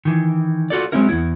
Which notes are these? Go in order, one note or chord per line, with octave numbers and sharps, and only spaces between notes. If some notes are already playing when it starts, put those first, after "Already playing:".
D#3 E3
F4 F#4 A4 D5
F#3 G#3 C4 C#4 E4 A#4
E2 B3 E4